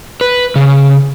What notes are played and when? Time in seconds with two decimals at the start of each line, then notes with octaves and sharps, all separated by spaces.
0.21 B4
0.56 C#3